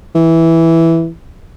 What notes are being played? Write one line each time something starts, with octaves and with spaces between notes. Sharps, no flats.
E3